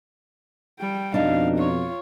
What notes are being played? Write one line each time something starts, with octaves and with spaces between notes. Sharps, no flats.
G3 G5
F2 B2 D4 D#4 F5
F4 C#5